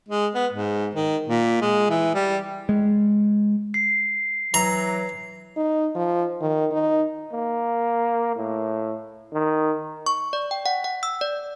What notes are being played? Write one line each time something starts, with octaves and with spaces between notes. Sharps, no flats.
G#3
B3
G#2
D#3
A#2
G#3
E3
G3
G#3
C7
E3 F#3 A#5
D#4
F3
D#3
D#4
A#3
A2
D#3
C#6
D5
G5
F#5
F#5
E6
D5